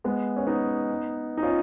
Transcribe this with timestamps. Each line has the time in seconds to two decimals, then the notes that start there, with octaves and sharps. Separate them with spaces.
0.04 G#3 B3
0.36 C#4
0.47 B3 D#4
1.37 D#4
1.43 C#4 F4